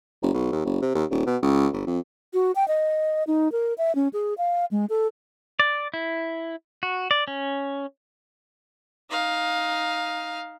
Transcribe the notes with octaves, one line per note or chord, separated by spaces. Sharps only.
F#1
B1
D#2
F#1
C3
D#2
D#1
B2
C#2
G1
F2
F#4
G5
D#5
D#4
A#4
E5
C#4
G#4
F5
G#3
A4
D5
E4
F#4
D5
C#4
D#4 F5